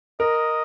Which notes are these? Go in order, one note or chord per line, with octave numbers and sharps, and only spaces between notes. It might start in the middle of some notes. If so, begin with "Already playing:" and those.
A#4 D#5